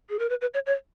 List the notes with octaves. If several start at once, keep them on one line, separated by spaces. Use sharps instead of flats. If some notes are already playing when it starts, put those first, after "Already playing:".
G#4
A#4
B4
B4
C#5
C#5